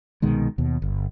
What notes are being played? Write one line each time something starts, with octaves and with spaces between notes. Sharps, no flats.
C2 B2 D#3 G#3
D#2 B2
G1